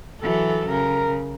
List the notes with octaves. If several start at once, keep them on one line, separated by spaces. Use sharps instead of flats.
E3 F#3 A4
C#3 A#4